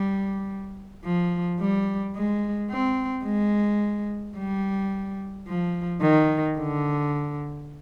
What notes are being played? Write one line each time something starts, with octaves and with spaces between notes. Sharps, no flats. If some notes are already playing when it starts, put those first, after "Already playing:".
Already playing: G3
F3
G3
G#3
C4
G#3
G3
F3
D#3
D3